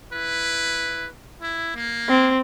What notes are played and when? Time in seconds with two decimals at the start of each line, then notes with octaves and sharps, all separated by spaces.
0.12 E4 B4
1.40 E4
1.75 A#3
2.09 C4